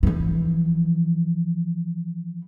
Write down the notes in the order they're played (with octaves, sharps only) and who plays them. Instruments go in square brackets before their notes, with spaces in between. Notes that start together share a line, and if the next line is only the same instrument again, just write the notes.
[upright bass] E3 F3